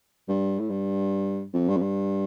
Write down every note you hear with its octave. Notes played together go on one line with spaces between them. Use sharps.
G2
A2
G2
F2
G2
F2
G2